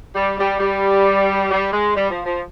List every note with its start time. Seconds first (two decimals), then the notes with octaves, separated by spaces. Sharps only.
0.15 G3
0.38 G3
0.59 G3
1.50 G3
1.72 G#3
1.95 G3
2.09 F3
2.25 F3